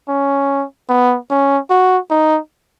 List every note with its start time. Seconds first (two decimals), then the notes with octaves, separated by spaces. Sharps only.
0.08 C#4
0.89 B3
1.30 C#4
1.70 F#4
2.11 D#4